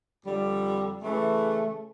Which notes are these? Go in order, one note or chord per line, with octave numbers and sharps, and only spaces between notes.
F2 D3 G3
C#3 E3 A3